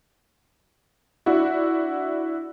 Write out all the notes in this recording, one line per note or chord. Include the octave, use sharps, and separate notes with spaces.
D4 E4 F#4